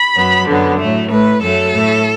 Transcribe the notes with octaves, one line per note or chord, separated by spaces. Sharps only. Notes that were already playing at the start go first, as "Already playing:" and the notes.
Already playing: B5
F#2 F#3 B3
F#2 D3 F#3 B3
A2 F#3 A3
A2 A3 B4
F#2 F#3 A3 A4
A2 A3